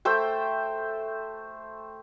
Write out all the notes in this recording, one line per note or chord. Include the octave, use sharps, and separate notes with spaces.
A3 C5 E5 G5